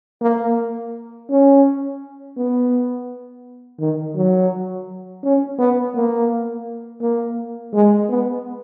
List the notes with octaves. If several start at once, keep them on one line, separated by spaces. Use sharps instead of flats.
A#3
C#4
B3
D#3
F#3
C#4
B3
A#3
A#3
G#3
B3